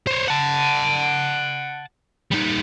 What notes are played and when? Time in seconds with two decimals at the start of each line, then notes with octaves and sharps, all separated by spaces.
0.07 C5 C#5
0.28 F#5 A5
2.31 G3 D#4